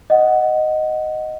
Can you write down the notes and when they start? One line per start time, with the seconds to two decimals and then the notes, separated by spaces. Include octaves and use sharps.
0.10 D#5 F#5